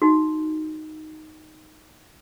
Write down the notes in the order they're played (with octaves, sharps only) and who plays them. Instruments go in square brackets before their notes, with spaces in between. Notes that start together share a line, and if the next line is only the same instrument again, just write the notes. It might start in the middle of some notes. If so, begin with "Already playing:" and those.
[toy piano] D#4 F#4